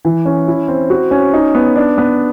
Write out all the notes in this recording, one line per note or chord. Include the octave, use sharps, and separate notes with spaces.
E3
C#4
E4
C4
F#4
C#4
D#4
B3
D4
B3